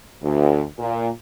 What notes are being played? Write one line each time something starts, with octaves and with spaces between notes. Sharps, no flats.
D2
A#2